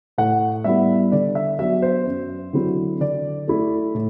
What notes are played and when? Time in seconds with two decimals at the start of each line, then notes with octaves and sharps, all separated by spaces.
0.18 A2 F#5
0.64 G3 B3 E4 E5
1.12 D3 D5
1.35 E5
1.59 F#3 B3 D4 E5
1.82 C5
2.07 F#2
2.53 D3 F#3 C4 E4
3.00 D3 D5
3.48 A3 E4
3.95 A2